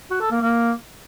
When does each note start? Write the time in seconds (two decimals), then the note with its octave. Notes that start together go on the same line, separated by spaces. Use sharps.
0.11 F#4
0.21 A4
0.31 A#3
0.41 A#3